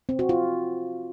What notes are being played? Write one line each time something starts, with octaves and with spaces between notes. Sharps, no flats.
C4
F#4
F4